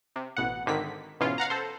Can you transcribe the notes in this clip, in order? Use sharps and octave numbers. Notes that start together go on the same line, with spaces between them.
C3
A1 B2 F#5
G#1 D3 D#3 B6
G#2 B2 E3 C#4 F4
F5 F#5 A#5
A4 C5